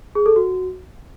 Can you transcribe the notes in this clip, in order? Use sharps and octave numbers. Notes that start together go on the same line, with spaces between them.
G#4
A4
F#4